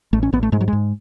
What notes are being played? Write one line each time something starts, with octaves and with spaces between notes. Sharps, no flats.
A1 A3
C#4
A1 B3
A3
G#2 G#3
F#3
G#2 G#3